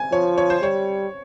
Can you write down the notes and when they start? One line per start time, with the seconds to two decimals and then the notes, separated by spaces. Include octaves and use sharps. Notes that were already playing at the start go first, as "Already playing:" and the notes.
Already playing: G#5
0.12 F3 C#5
0.38 C#5
0.50 C5
0.62 G3 C#5